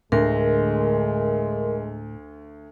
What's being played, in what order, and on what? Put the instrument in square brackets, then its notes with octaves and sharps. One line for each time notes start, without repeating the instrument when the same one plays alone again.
[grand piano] D2 [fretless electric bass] A2 D3 [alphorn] G#3 [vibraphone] A#4